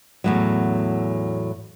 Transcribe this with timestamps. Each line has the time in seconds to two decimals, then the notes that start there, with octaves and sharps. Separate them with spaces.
0.24 E2 A2 F#3